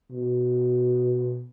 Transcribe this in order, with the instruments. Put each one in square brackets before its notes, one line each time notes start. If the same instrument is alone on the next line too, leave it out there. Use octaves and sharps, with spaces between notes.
[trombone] B2